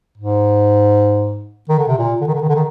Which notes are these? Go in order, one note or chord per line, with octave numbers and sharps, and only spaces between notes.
G#2
D#3
D3
C3
A#2
D3
D#3
D3
D#3
D3
D#3